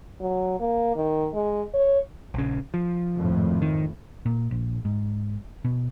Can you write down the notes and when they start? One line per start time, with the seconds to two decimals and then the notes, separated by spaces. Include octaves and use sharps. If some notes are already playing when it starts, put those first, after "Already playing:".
0.20 F#3
0.60 A#3
0.96 D#3
1.34 G#3
1.74 C#5
2.34 A#1 C#3
2.74 F3
3.17 G#1 F2 A2
3.62 D#3
4.26 A#2
4.51 A#1
4.85 G#2
5.65 B2